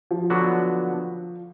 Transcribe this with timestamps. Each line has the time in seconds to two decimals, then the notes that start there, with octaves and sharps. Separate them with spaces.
0.11 F3
0.30 D3 F#3 B3 D4 F#4